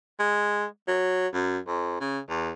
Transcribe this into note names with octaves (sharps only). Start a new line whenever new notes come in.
G#3
F#3
F#2
F2
C#3
E2